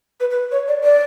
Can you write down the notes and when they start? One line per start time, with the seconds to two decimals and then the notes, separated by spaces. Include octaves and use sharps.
0.20 B4
0.30 B4
0.51 C#5
0.67 D5
0.83 D5